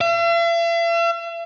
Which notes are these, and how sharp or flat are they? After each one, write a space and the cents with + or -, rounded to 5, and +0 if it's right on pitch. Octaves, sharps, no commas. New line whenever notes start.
E5 +45